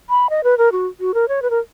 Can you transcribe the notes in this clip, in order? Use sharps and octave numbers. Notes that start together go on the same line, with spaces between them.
B5
D#5
B4
A#4
F#4
F#4
A#4
C#5
B4
A#4